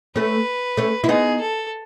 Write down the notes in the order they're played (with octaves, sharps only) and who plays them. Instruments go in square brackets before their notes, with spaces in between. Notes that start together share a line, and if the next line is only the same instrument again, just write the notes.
[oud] A3 C#4 [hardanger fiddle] B4
[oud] A3 C#4
E4
[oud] B3 D#4 [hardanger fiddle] G#4
[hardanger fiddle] A4